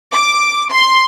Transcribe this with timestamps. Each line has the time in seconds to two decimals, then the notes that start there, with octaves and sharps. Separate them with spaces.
0.12 D6
0.71 C6